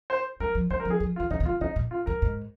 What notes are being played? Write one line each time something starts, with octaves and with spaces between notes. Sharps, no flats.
C5
G3 A#4
F3
G3 C5
A#4
F3
G#4
F3
F4
D#3
D3 D#4
C3
D3 F4
C3 D#4
A#2
F4
G2 A#4
G#2